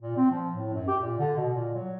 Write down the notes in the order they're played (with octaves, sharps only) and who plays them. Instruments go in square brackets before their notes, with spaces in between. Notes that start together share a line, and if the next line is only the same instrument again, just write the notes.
[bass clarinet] A#2
C4
F3
A2
F#2
G4
A#2
D3
B2
A#2
F#3